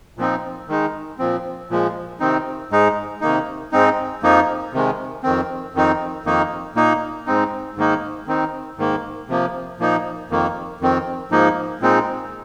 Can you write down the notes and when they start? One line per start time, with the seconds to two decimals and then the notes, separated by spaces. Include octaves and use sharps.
0.18 A#2 F3 C4 D#4
0.69 D#3 G#3 D#4
1.19 A#2 F3 C4
1.70 A#2 F3 G#3
2.20 C3 D#3 C4 D#4
2.70 G#2 G#3 D#4
3.21 C3 D#3 A#3 D#4
3.72 G#2 G#3 C4 D#4
4.23 F2 F3 A#3 D#4
4.73 C3 D#3 G#3
5.23 F2 D#3 C4
5.74 F2 D#3 C4 D#4
6.25 F2 D#3 A#3 D#4
6.75 A#2 A#3 D#4
7.26 G#2 G#3 C4 D#4
7.76 G#2 D#3 A#3 D#4
8.27 D#3 C4 D#4
8.78 G#2 D#3 A#3
9.29 C3 F3 A#3
9.79 A#2 F3 A#3 D#4
10.30 F2 D#3 A#3
10.80 F2 D#3 C4
11.31 G#2 F3 A#3 D#4
11.81 A#2 G#3 C4 D#4